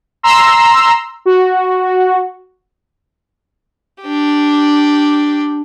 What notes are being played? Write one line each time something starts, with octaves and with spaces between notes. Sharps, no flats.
A#5 C6 E6
F#4
D4 G4